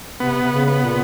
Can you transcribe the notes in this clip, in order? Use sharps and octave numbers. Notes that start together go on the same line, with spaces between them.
C3 B3
C3
C#3
B3
A#2